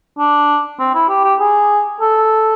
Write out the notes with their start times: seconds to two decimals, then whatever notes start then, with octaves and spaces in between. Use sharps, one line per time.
0.19 D4
0.80 C4
0.94 E4
1.09 G4
1.24 G4
1.40 G#4
2.01 A4